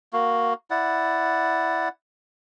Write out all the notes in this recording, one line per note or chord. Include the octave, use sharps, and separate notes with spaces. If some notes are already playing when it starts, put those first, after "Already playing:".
A#3 F#4
E4 D5 F#5